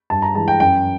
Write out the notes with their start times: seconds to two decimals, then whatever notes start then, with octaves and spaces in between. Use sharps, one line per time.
0.10 G2 A5
0.22 A#5
0.34 E3 G#3 A5
0.48 G5
0.60 F#2 G5